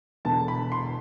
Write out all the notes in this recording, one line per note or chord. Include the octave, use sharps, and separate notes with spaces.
E1 E2 D3 A5
B5
C6